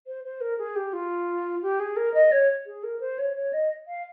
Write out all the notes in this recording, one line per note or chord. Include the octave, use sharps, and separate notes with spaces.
C5
C5
A#4
G#4
G4
F4
G4
G#4
A#4
D#5
C#5
G#4
A#4
C5
C#5
C#5
D#5
F5